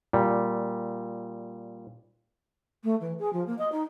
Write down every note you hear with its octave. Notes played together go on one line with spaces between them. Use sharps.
A#2 G3
A3
E3
G#4
F3
A#3
D#5
D#4